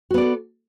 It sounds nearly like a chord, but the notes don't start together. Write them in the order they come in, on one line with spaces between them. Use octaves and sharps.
F#4 B3 D5 A4